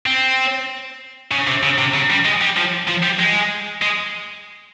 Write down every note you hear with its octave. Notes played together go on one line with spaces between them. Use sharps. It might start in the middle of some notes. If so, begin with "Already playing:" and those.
C4
C#3
C3
C#3
C3
C#3
G3
G#3
G3
F3
F3
G3
G#3
G#3